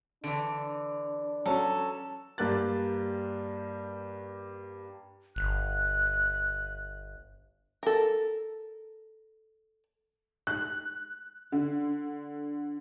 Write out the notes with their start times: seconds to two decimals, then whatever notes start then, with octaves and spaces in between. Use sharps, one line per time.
0.24 D3 E3 D4 D7
1.46 F#3 C#4 F#4 A4
2.38 G2 A#3 G4 F#6 A6
5.36 G1 F#6
7.83 A4 A#4
10.47 F#6
11.52 D3